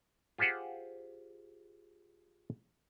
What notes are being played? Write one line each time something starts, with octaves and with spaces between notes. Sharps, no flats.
F4 G4 G#4 C5 F#5